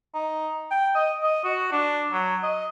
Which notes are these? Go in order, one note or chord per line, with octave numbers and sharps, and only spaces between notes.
D#4
G5
D#5
D#5
F#4
D4
F#3
D#5